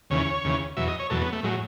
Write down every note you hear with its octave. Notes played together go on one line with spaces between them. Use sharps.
D#2 C#3 E3 C#5
D#2 C#3 E3
E2 B2 F#3 E5
D#5
C#5
E2 B2 F#3 A4
B3
A3
A2 F#3 G#3